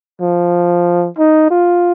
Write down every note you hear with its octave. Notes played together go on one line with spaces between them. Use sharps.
F3
D#4
F4